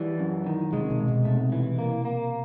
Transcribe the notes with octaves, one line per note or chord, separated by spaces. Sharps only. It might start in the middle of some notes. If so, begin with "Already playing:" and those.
Already playing: E3 G3
F#2
D#3
C3 G#3
B2
G#2
B2
C3 A3
E3
A#3
A#3